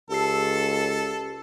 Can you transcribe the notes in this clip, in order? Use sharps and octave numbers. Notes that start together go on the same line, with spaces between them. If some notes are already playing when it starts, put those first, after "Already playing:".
C#2 G4 A4 E6 C7